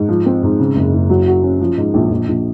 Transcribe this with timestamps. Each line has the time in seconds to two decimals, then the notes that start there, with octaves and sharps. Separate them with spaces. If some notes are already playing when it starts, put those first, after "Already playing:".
Already playing: G#2
0.09 F3
0.26 C4
0.43 G#2
0.60 C#3
0.76 F#1
0.93 F#1
1.10 F#3
1.27 F#4
1.43 C#4
1.60 F3
1.77 G#2
1.94 A#1
2.10 A#1
2.28 A#1